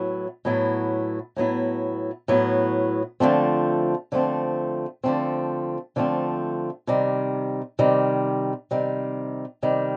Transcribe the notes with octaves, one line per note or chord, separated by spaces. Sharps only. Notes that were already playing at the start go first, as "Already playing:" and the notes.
Already playing: A2 F#3 B3 E4
A2 F#3 B3 E4
A2 F#3 B3 E4
A2 F#3 B3 E4
D3 F3 A3 C4
D3 F3 A3 C4
D3 F3 A3 C4
D3 F3 A3 C4
C3 D#3 G3
C3 D#3 G3
C3 D#3 G3
C3 D#3 G3